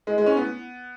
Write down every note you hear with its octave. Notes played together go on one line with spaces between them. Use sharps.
G#3
G#3
C#4
B3